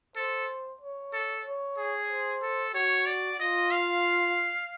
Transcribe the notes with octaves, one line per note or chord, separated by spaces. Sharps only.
A4 C5
C#5
A4
C#5
G#4
C5
A4
F#4 C#5
D5
F4 D#5
F5